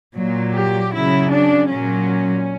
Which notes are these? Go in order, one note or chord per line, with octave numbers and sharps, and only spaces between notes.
A#2 F#3
G4
C#3 F#3 E4
D4
A#2 F#3 C#4